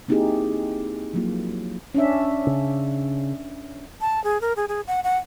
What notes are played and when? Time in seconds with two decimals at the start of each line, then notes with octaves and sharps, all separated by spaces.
0.08 A#3 C4 D#4 E4 G4 G#4
1.13 F3 F#3 A#3 F4
1.94 C#4 D4 E5
2.47 C#3
4.01 A5
4.24 G#4
4.41 A#4
4.56 G#4
4.69 G#4
4.87 F#5
5.04 F#5